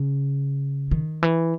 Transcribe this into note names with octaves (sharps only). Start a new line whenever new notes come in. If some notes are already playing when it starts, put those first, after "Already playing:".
Already playing: C#3
D#3
E3